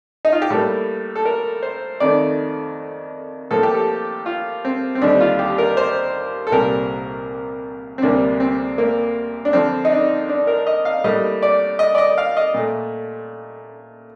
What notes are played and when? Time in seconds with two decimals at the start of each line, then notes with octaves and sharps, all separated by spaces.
0.25 D#4
0.32 F4
0.42 G4
0.50 A2 G3 A#3 A4
1.16 A4
1.25 A#4
1.63 C5
2.00 F2 D#3 A3 D5
3.51 A2 F3 A#3 A4
3.63 G4
3.74 A4
4.26 F4
4.65 C4
4.95 C4
5.02 D#2 D3 G3 D4
5.21 F4
5.39 G4
5.58 A#4
5.77 C5
6.47 A4
6.52 C2 A#2 G3 A#4
7.98 C4
8.02 D2 C3 G3 A#3 D4
8.40 C4
8.78 A#3
9.45 D4
9.53 F2 D3 F3 C4
9.85 D#4
9.92 D4
10.29 D4
10.47 A#4
10.67 D#5
10.85 F5
11.04 A2 G3 A#3 D#5
11.43 D5
11.79 D#5
11.95 D5
11.98 D#5
12.18 F5
12.37 D#5
12.54 A#2 A3